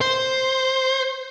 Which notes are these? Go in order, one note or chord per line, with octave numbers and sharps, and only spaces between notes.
C5